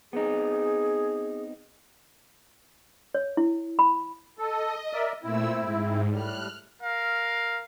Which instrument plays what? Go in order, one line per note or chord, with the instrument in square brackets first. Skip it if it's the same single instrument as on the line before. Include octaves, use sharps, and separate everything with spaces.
[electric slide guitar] B3 C4 D#4 [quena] G#4
[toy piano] C#5
E4
B5
[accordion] A4 [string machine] D#5
[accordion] A#4 D5 E5
[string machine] A#2 A3 E6 [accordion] C4 E4
[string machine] G#2
[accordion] A2 G3 [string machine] F6 F#6
[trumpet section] A#4 F5